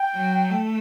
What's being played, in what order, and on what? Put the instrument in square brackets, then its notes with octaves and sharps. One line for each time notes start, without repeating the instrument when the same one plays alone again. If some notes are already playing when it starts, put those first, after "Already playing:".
Already playing: [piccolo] G5
[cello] F#3
A3